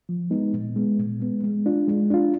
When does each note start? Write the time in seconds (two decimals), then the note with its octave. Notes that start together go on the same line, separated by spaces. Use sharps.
0.09 F3
0.30 G#3 B3 D#4
0.53 A#2
0.76 G#3 B3
0.98 A#2
1.20 G#3 B3
1.43 G#3
1.66 D4 F4
1.88 G#3
2.10 D4 F4